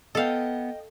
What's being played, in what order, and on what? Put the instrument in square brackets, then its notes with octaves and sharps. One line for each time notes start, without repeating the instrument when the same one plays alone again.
[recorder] B3 [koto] A4 F5 [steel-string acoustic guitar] D#5 G5